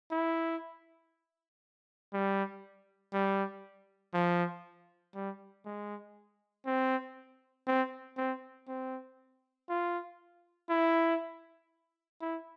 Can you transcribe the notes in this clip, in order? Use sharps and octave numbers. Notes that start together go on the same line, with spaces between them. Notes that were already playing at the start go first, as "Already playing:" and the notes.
E4
G3
G3
F3
G3
G#3
C4
C4
C4
C4
F4
E4
E4